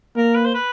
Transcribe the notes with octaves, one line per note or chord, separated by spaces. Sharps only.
A#3 A#4
B4
C5
B4